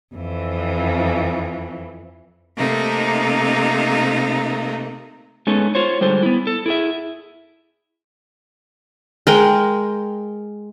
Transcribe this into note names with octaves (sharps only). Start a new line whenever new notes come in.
F2 E3
C3 A3 A#3 D#4
G#3 A3 B3 C#4 D#4 A4
F4 C5 C#5
D3 G3 G#3 A4 C5
B3 E4
A4
E4 G#4 E5
G#3 A#4 G5